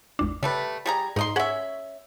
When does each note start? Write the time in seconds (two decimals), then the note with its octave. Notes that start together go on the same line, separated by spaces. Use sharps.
0.19 G#1 E2 D4
0.43 C#3 G3 A3 B4
0.86 G3 G#4 A#5
1.16 G#2 D#4 D#5 C6
1.36 C#4 G#4 E5 F#5